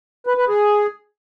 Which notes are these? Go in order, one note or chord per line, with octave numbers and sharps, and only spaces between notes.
B4
B4
G#4